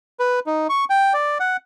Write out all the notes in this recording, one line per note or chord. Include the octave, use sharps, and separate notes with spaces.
B4
D#4
C#6
G5
D5
F#5